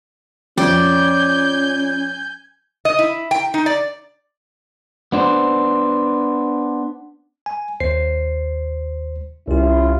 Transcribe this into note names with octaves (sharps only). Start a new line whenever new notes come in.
F2 C#4 D5 G#5 G6
D#5
E4
G5
D#4
D5
B3 D4 C5
G#5
D#2 C5 C7
C2 C#4 E4 F4 G4